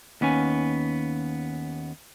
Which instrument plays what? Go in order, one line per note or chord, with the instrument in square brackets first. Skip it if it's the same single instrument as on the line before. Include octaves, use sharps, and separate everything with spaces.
[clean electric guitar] D#2 B3 C#4 G#5